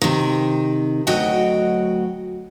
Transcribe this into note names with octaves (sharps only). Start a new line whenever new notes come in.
C3 D#3
D2 F#3 F#4 C#5 D#5 G5